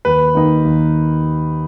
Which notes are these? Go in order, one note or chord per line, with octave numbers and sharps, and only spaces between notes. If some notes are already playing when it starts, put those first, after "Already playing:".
D#2 B4
D#3 A#3 D#4
D#2